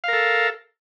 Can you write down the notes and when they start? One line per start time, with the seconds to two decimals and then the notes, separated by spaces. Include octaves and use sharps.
0.04 F5
0.08 A#4
0.13 A4